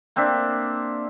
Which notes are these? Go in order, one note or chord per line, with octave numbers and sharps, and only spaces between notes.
A#3 C4 D4 E5